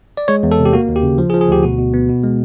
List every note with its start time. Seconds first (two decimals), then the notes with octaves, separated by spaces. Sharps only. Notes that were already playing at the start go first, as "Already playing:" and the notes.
0.17 D5
0.28 G#3 C#5
0.43 E2
0.52 A4
0.59 C3
0.65 G4
0.73 A#3 F#4
0.89 D#2
0.96 G4
1.03 C#3
1.18 F3
1.30 G#4
1.34 F3
1.41 G#4
1.48 D2 G4
1.63 B2 F#4
1.78 B2
1.94 B3
2.09 B2
2.23 G#3